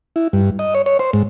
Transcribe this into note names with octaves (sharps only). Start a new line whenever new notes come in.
E4
G2
D#5
C#5
C#5
C5
G#2